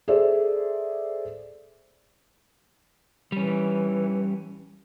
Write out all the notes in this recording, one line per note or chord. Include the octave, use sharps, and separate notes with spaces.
G#4 A4 C5 D5 E5
E3 G3 C#4